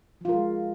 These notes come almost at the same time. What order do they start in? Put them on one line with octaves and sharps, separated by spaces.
F3 F4 A#4 G#3